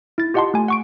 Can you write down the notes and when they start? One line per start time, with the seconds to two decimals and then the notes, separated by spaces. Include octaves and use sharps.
0.18 E4 A6
0.34 F4 G4 D#5 F#5 A5 C6
0.54 A3 G#5
0.68 F#5 C#6 D7